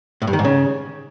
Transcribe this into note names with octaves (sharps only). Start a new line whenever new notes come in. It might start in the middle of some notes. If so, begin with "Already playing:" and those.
A2
G2
D#3
G#2
C#3